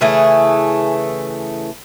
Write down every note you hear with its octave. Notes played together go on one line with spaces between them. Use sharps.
C#3 E3 A3 G#4